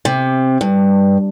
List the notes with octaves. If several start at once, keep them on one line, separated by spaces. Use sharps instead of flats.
C3
G2